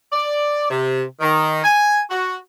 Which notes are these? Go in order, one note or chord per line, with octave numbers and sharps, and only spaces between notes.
D5
C3
D#3
G#5
F#4